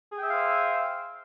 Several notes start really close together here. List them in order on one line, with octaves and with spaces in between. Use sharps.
G#4 G5 E5 F5 C5